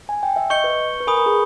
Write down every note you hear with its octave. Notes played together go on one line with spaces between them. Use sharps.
G#5
G5
E5
D#5 C#6 G6 C#7 G7
B4
B4
A#4 G#5 B5 D#6
A#4
G#4